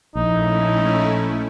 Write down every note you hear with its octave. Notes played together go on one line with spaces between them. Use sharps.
A#1 A3 C#4 D#4 E4